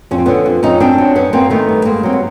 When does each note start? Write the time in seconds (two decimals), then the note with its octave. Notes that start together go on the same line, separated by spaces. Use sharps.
0.11 F2 C#4
0.18 C4
0.26 D3 B3 C#4
0.46 F2
0.63 F2 C#4 D#4
0.80 F#2 C4 D4
0.98 F#3
1.15 F#2 B3 C#4
1.33 F#2 A#3 C4
1.50 D#3 A3 B3
1.69 G2
1.85 G2 G#3 A#3
2.03 F#3 C4
2.13 B3